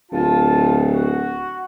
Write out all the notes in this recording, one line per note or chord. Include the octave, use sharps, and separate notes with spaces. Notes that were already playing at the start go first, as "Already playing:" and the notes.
D1 F4 A5
F#4